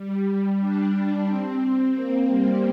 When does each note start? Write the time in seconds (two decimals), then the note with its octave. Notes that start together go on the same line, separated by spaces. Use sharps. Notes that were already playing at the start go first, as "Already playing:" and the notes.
Already playing: G3
0.60 D4
1.27 C4
1.94 A#3
2.27 G3